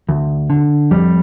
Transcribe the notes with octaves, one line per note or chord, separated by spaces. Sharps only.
D2
D3
F2 G3